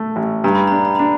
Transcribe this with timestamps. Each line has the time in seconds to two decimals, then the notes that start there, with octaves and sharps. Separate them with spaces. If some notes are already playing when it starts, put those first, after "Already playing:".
Already playing: A3
0.16 A1
0.44 G2 A#5
0.55 B5
0.67 D4 A#5
0.85 A#5
0.96 D4 B5